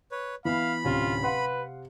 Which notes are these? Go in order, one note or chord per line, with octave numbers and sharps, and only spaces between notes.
B4 C#5
E3 B3 F5 B5
D1 C3 C#4 F4
B4 F5 F#5 C6